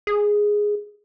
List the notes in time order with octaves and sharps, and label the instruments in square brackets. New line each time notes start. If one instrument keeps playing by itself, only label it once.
[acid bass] G#4